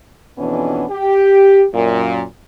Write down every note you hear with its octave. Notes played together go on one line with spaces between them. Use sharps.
F2 B2 E3 B3 C#4 D4
G4
F#2 A#2